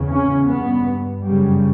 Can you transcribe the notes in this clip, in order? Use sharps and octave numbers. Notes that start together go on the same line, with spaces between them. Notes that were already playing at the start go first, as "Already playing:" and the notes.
Already playing: E2 C#3
C#4
G2 B3
F#2 C#3 G3